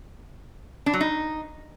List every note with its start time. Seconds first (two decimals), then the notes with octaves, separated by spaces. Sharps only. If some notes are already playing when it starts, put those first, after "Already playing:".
0.86 D4
0.93 F#3
1.01 D#4